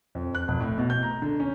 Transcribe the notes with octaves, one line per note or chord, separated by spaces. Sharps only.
F2
F#6
F1
A2
B2
G6
A#5
D3
C#4